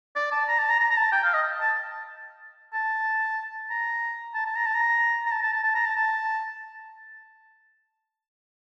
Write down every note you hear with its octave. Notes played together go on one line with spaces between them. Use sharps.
D5
A5
A#5
A5
A#5
A#5
A#5
A5
G5
F5
D#5
A5
A5
A#5
A5
A5
A#5
A5
A#5
A#5
A5
A5
A5
A5
A#5
A5
A5